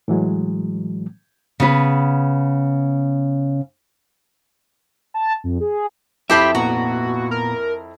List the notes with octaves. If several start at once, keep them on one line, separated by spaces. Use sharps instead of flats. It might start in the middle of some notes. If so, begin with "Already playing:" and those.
A2 E3 F#3 G#3
C#3 B3 B4
A5
F2
G#4
F2 E4 G4 C5 E5 A5 B5
A#2 B3 F#4 A#5
A#4